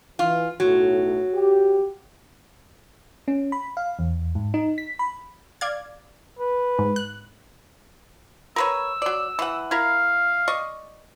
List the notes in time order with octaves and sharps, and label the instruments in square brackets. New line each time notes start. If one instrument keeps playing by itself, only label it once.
[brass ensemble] E3 [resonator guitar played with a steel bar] F4
[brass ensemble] B1 A2 [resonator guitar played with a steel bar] F#3 [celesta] F#4
[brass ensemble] G4
[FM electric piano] C#4
B5
F5
E2
G#2
D#4
B6
B5
[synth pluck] D5 F5 G#6
[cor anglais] B4
[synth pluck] G#2
F#6
[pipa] A#4 B4 C#5 [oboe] E6
[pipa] F#3 D5
E3 F#5
[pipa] E4 A#4 [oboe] F5
[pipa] D5 D#5 C#6